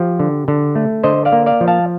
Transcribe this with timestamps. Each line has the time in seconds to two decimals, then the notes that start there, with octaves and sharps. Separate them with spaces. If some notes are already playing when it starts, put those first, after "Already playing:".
Already playing: F3 G4
0.20 D3
0.48 D3
0.75 A3
1.04 D3 C5 D#5
1.25 D5 F5
1.32 A#3
1.46 D5 F5
1.61 F3
1.68 F5 A5